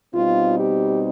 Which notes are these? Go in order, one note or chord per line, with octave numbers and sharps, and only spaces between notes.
B2 G3 C4 D#4 F4
G4